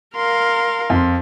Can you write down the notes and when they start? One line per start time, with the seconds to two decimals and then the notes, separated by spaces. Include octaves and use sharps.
0.16 A#4 F5 C6
0.90 F2